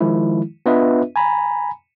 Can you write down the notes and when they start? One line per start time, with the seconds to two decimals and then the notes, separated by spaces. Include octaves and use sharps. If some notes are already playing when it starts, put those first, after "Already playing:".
0.01 D#3 F3 G#3 E4
0.66 B3 D4 F4 B4 D#5 E5
1.16 G#5 A#5 B5